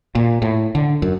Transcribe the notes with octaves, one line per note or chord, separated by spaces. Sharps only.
A#2
A2
D3
F#2